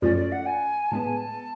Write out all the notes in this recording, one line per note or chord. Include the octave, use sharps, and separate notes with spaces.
F#2 F3 A3 C#4 D5
D5
F#5
G#5
A2 G#3 B3 A5
G#5
A5